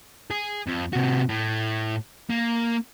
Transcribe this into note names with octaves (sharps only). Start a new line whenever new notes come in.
G#4
F2
C3 F#4
A2
A#3